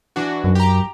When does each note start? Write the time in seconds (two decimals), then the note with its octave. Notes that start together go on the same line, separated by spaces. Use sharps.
0.16 E3 D4 F#4
0.44 F#2
0.55 G4 A#5